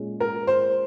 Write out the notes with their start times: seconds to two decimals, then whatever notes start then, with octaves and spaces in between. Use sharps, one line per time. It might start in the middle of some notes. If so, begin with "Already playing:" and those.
Already playing: A#2 G#3 C#4
0.20 A#4
0.47 C5